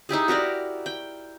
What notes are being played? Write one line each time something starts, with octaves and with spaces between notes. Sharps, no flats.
D#4 E4 G4 G#4
F#4 G4 A#4 D5
G5